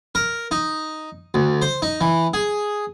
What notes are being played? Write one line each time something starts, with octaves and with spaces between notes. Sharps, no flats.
A#4
D#4
D2
C5
D#4
E3
G#4